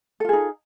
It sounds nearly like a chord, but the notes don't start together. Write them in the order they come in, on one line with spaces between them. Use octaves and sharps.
A4 F4 G#4 D#4